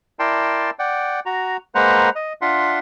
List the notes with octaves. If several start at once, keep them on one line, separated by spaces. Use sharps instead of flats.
E4 A#4 D5 G5 A5 C6
D5 F#5 G5
F#4 A#5
G#3 A#3 B4 C5 F#5 A#5
D#5
D4 F4 E5 F#5 C6